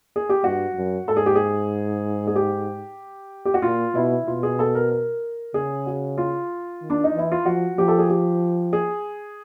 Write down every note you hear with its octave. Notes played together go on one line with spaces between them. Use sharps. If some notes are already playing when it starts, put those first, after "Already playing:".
G#4
G4
G2 F#4
F#2
G#2 A4
G#4
G4
G#4
G#4
G4
G4
F#4
A#2 F4
B2 E4
B2 F4
G#4
A4
A#4
A#4
C#3 G#4
F#4
F4
D#3
D4
D#4
E3
E4
F4
F3 F#4
F3 G4
A4
G#4
G4
G#4